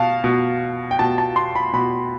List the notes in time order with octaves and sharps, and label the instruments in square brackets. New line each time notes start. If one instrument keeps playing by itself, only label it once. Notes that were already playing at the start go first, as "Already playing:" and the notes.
Already playing: [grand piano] B2 F5 A5
B2
G5
B2 A5
A5
C6
B5
B2 B5